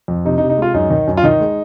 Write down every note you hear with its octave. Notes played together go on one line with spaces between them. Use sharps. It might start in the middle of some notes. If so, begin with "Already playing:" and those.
F2
C3 D#4
D#4
C3
D#4
G#3 F4
F#2 D#4
D#3
F#2
F4
D#3 D#4
G#3